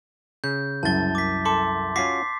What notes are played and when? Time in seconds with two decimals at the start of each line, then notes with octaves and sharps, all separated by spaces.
0.44 C#3 G6
0.83 C2 F#2 A5 A6 G7
1.15 D6 B6
1.45 A4 A5 C6 D6
1.96 C#4 F4 F#4 D6 B6 C7